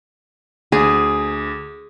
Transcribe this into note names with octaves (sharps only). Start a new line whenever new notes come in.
D2 G#4